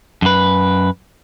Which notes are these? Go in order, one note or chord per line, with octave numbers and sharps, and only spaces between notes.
F#2 B4